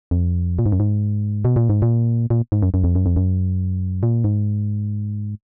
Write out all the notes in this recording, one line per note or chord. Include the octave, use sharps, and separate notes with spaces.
F2
A#2
G#2
F#2
G#2
B2
A#2
G#2
A#2
A#2
G#2
F#2
F#2
F2
F#2
F2
F#2
A#2
G#2